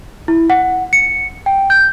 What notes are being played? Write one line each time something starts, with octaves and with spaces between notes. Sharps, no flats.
E4
F#5
C#7
G5
G6